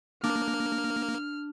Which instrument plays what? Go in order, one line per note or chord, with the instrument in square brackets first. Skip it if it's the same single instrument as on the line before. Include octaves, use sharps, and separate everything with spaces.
[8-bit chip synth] A#3 [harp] D4 [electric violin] F6